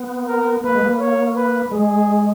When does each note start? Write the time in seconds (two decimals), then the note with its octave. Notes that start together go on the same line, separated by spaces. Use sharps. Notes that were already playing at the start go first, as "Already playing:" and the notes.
Already playing: B3
0.28 A#4
0.64 A#3 B4
0.75 G#3
0.81 A#3
1.00 C#5
1.36 B4
1.72 G#3 G#4